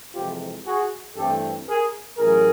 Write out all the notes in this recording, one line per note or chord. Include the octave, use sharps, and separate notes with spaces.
F2 C3 E3 G#3 C4 F4 G4
F#4 G#4
G2 E3 A3 C4 G4 A4
G#4 A#4
A1 A2 F#3 G#4 A#4